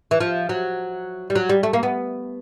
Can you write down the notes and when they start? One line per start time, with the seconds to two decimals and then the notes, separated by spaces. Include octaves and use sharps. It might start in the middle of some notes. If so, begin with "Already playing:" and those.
0.11 E3
0.20 F3
0.49 F#3
1.30 G3
1.36 F#3
1.49 G3
1.63 A3
1.73 A#3
1.83 B3